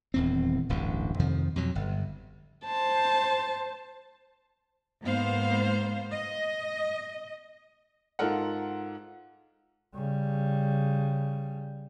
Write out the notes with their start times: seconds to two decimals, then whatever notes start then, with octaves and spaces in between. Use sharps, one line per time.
0.14 D#1 E2 C4
0.69 D1 A1 G2
1.19 F2 C3 D#3 F3
1.56 F2 B2 F#3
1.75 G1
2.66 C5 A5
5.03 G#2 A#3 B3 C5 F5
6.11 D#5
8.19 G#2 F4 A4 A#4 F#5
9.95 C#3 G3